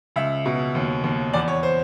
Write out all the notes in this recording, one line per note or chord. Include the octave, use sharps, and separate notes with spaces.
C#2 E5
B2
D#2
D#2
E2 D5
C#5
C5